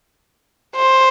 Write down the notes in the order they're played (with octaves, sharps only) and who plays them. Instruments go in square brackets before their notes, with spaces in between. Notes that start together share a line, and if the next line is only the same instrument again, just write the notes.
[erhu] C5